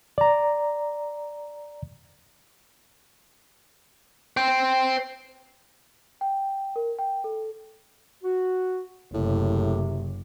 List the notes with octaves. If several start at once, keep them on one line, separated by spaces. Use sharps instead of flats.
D5 A#5
C5 G5
G5
A#4
G5
A4
F#4
F#1 A2 C3